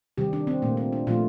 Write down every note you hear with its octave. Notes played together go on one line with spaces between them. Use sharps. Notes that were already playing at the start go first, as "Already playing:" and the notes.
C3 D#3 G3 G4
D4
C4
A#2 A3 A#3
C4
D4
A#2 F3 A3 F4